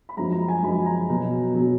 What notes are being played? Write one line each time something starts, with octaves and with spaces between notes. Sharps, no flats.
B5
F#2 F3 G#3 A#5
A#5
G#5
F#2 F3 G#3 B5
A#5
B2 F#3
B2 F#3